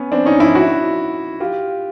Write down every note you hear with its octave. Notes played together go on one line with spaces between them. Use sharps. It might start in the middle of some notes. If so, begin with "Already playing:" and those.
Already playing: B3 C#4
C4 D4
C#4 D#4
D4 E4
E4 F#4
F4 G4